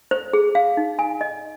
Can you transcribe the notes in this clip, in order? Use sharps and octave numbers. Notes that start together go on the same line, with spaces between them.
C5
G#4
F5
D#4
G#5
D#5